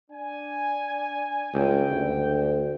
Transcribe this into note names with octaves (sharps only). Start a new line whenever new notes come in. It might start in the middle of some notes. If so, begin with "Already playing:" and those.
D4 G#5
C#2 G2 D4 G5
D2